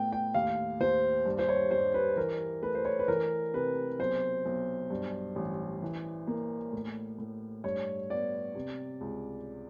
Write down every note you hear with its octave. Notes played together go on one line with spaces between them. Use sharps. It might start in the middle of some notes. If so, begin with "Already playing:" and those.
Already playing: A2 B3 G5
G5
D#2 F5
D#2 C5
G2
C5
C#5
G2 C5
B4
E3 A#4
A3 B4
C5
C#5
B4
E3 A#4
C3 B4
B1 C5
B1
G2
A1
E3
A#3
A2
A2
G2 C#5
B3 D5
C3
C#2